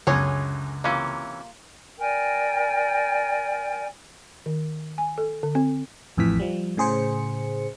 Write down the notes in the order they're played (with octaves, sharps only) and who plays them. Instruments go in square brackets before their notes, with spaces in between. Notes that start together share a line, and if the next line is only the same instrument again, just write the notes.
[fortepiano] C#2 F#2 [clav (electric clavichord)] D3 [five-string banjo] C#4 G#4 C#5
[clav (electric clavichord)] C3 E3 C#4 [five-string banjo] A#3 F4
[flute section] A#4 D5 G5 G#5
[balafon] D#3
G#5
A4
D3
C4
[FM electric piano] A1 F2 A2 E3 B6
F3 G3
A2 C#3 G#4 C5 C#7